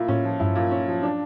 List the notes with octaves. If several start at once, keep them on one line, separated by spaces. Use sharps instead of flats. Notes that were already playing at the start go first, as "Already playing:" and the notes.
Already playing: A#2 E4
A2 C#4
F3
G2 E4
A#2
C#4
F3
D4